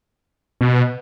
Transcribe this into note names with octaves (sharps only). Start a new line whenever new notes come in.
B2